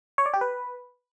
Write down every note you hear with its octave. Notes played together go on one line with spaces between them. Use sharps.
C#5
D5
G4
B4